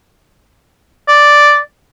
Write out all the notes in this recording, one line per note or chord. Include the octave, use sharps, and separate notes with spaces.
D5